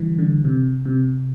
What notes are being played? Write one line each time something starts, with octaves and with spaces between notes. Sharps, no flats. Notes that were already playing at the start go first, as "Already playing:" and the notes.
Already playing: D3 E3 G3
D3
C3
C3